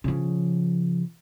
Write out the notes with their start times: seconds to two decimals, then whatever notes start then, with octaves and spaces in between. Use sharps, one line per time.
0.04 C#3 F3